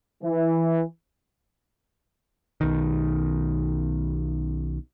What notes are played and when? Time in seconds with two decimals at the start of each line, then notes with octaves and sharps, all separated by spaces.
0.22 E3
2.61 B1 D#3